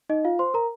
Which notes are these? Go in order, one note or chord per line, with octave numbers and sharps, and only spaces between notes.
D#4 D#5
F4 F5
C5 C6
A#4 A#5